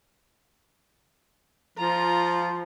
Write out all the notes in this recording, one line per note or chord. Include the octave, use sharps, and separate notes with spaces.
F3 F4 A#5